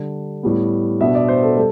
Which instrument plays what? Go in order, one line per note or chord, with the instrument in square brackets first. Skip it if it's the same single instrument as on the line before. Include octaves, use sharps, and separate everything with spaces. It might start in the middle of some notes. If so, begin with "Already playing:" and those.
Already playing: [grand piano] D3 G3 D4
A2 G3 B3
B2 B3 D4 E5
D5
C5
A4
G3 A4